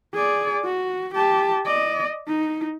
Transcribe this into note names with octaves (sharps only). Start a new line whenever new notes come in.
G#4 D5
F#4
G4 A5
D5 D#5
D#4